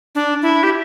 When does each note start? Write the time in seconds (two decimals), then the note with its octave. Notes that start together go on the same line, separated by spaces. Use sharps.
0.15 D4
0.42 E4
0.63 G4